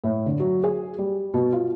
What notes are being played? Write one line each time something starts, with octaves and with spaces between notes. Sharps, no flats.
A2
D3
F#3
G#4
G3
B2
F4